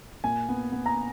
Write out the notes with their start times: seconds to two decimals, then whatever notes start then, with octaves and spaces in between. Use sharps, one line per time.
0.24 A#2 G#5
0.49 B3
0.72 B3
0.86 A#5